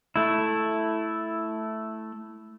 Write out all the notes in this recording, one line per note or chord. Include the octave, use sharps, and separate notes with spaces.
A3 E4